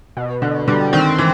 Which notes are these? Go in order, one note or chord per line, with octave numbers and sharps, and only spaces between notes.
B2
B2 D3
D3 G3
D#3 C4
E3